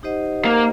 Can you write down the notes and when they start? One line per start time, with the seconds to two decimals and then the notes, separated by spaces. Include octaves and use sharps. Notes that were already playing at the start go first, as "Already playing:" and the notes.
0.03 D#4 G4 C5 D#5 F#5
0.45 A#3